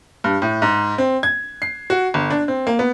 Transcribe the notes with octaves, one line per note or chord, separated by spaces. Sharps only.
G2
A2
G#2
C4
G#6
C7
F#4
G1
D4
C4
A#3
B3